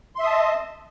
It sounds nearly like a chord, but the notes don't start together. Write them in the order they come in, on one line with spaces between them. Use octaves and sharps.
C6 E5 D#6 A5 D#5